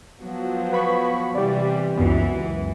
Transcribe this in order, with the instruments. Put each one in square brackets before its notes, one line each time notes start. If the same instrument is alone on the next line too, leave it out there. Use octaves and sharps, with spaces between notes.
[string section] F3 F#3 B3
[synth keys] B4 B5 C#6
[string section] C3 E3 G3 [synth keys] G4 D5
[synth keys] C#2 F#2 B3 [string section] E3